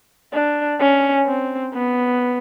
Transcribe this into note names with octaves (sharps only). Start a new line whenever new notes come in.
D4
C#4
C4
B3